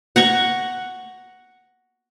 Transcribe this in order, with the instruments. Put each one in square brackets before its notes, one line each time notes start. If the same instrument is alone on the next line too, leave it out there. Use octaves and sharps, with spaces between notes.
[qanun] F#5 A#5 C#6